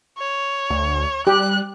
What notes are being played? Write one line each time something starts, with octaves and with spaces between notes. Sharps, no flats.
C#5
D2
G3 G4 F#6